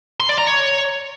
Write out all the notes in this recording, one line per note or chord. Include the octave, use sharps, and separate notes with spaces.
C6
D5
A#5
C#5